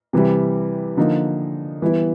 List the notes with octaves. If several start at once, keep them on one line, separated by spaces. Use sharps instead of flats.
C3 E3 G3
D3 F3 A#3 D#4
E3 G3 B3 E4